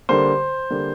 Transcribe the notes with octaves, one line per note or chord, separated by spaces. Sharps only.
D3 G3 A#3 C5
D3 G3 A#3